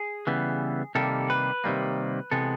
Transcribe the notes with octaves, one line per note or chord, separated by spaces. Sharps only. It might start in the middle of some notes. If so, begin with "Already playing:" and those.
Already playing: G#4
C#3 E3 G3 B3
C3 D#3 G3 A#3 A4
B4
C3 D#3 G3 A#3
C3 E3 G#3 B3 A4